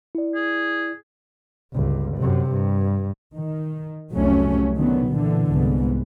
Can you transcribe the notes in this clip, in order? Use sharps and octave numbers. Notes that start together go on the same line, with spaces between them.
E4 D5
G#4
G1 C#2
F#2 C3
G2
D#3
F1 C2 C3 F#3 A3 C#4
D3 D#3 F#3 B3
A#2 D3 E3
C2 G#2 B3